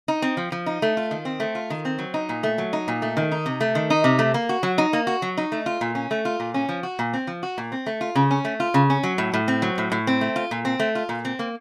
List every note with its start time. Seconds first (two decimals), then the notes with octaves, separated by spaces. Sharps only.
0.08 D#4
0.22 C4
0.37 F3
0.52 F3
0.66 D#4
0.82 A3
0.97 F4
1.11 D#3
1.25 C4
1.40 A3
1.55 F4
1.70 D#3
1.85 C4
1.99 F#3
2.14 D#4
2.29 A#2
2.43 A3
2.58 F#3
2.73 D#4
2.88 A#2
3.02 A3
3.17 D#3
3.32 D#4
3.46 C3
3.61 A3
3.75 D#3
3.90 D#4
4.04 C3
4.19 A3
4.34 A#3
4.49 F#4
4.63 F#3
4.78 D#4
4.93 A#3
5.07 F#4
5.22 F#3
5.37 D#4
5.52 A3
5.66 F4
5.81 A#2
5.95 C#4
6.11 A3
6.25 F4
6.40 A#2
6.54 C#4
6.69 F3
6.83 F#4
6.99 A#2
7.14 C4
7.27 F3
7.43 F#4
7.58 A#2
7.72 C4
7.86 A3
8.01 F4
8.15 C#3
8.31 C#4
8.45 A3
8.60 F4
8.74 C#3
8.90 C#4
9.03 F#3
9.18 A2
9.33 A2
9.48 C4
9.62 F#3
9.78 A2
9.92 A2
10.07 C4
10.21 A3
10.36 F4
10.51 A#2
10.65 C4
10.80 A3
10.95 F4
11.09 A#2
11.25 C4
11.39 A#3